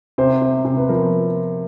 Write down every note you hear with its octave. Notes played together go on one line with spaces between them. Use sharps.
C3 C5
C3
C3
B4
F3 A#4